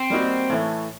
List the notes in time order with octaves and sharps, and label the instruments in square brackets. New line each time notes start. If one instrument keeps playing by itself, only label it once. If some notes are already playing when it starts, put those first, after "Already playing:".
Already playing: [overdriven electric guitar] C4
[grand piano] G3 A#3 D#4 F#4
A2 E3 A3